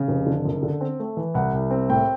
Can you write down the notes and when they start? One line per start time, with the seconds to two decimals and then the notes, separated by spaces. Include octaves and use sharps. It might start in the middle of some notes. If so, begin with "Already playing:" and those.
Already playing: C#3
0.08 F1
0.27 D3
0.45 F#1
0.63 D3
0.81 C4
1.00 A3
1.17 E3
1.34 C2 F#5
1.53 C2
1.71 C4
1.89 A2 G5